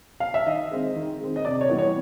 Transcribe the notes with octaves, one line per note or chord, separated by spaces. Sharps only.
F5
E5
D#3 D#5
G#3 C4
D#3
G#3 C4
D#5
C3 D5
C#5
E3 G3 B3
C#5